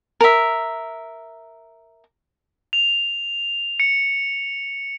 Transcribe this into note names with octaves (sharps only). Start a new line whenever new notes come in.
A#4 E5
F7
C#7